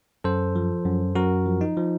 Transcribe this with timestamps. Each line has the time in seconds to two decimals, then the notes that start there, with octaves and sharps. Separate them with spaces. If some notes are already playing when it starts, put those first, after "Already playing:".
0.24 F#2 A4 C5
0.56 F3
0.86 F#2
1.15 F#2 F#4 A#4
1.46 F3
1.61 D#4
1.77 F3